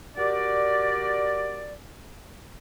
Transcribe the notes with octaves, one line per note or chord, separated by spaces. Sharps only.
F#4 G4 A#4 D5